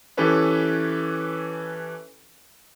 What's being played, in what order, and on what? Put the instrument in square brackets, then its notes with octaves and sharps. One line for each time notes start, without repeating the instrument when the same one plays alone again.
[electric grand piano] E3 C#4 G4 A4 B4 C#5